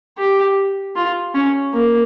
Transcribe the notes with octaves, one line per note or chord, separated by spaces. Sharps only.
G4
F4
C#4
A#3